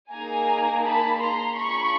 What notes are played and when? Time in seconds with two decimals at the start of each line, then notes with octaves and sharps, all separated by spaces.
0.11 A#3 D#4 G#4 G#5 A#5
0.84 A5 B5
1.20 A#5 C6
1.56 D4 F4 G#4 B5 C#6